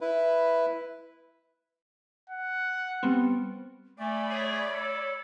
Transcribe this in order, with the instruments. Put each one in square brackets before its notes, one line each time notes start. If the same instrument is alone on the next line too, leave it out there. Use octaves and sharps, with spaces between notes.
[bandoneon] E4 B4
[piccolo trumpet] F#5
[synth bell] G3 B3 C4
[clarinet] A3 [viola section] D5 B5 [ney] G#5
[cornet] G#4 [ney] C#5
[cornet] A4